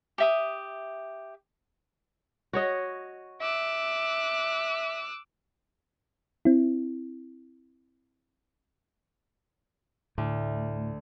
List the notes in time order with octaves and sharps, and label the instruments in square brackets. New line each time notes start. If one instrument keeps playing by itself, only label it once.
[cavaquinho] G4 E5 D#6
[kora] F#4 C#5 D#5
[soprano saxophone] E5 [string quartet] D6 E6 F#6
[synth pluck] C4 E4
[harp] D2 [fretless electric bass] A2